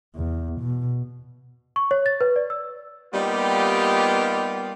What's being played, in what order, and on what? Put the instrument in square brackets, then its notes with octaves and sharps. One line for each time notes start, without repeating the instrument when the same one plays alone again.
[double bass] E2
B2
[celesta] C#6
C#5
A6
B4
D5
E6
[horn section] G3 A#3 B3 D#4 F4 G4